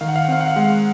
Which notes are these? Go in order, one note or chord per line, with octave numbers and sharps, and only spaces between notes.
D#3 F5
F#5
F5
F#5
C4 F5
F#5
F5
G#3 F#5
F5